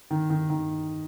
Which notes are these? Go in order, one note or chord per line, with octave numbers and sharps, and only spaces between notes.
D#3
D#3
D#3